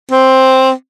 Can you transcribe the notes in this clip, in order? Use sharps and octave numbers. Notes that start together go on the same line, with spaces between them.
C4